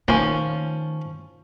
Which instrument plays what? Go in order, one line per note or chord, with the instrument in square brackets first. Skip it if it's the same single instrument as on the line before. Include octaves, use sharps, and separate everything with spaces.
[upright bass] D#3 A3 [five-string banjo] F3 C#4 [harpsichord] A#3